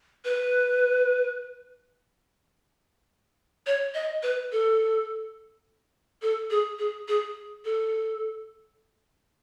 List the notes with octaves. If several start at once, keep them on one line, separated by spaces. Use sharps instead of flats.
B4
C#5
D#5
B4
A4
A4
G#4
G#4
G#4
A4